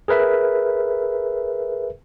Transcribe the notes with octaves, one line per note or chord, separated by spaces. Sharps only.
G#4 A#4 B4 E5